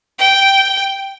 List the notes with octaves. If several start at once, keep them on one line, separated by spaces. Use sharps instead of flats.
G5